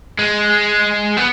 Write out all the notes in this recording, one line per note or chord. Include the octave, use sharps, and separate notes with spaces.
G#3
B3